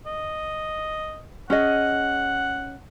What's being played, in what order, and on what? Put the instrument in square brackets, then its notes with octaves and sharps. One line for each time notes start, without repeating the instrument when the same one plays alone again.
[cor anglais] D#5
[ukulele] C#4 G#4 D#5 [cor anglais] F#5